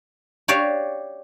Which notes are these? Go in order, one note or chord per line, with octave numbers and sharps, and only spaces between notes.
F#4 G4 C#5 D5 F5